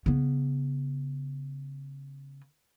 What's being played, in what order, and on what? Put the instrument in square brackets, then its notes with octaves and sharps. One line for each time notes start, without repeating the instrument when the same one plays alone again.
[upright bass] C#3 B3